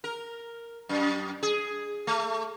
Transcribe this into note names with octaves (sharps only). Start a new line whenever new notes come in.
A#4
F#2
G#4
A3